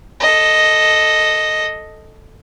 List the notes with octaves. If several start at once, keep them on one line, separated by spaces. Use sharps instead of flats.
A4 D#5